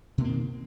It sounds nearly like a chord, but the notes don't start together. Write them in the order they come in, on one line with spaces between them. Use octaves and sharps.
B2 A#3 C4 D#3